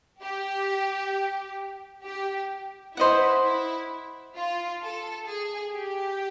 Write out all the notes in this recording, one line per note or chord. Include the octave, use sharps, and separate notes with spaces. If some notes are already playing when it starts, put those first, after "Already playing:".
G4
G4
E4 C5 D#5 F#5
E4
F4
A4
G#4
G4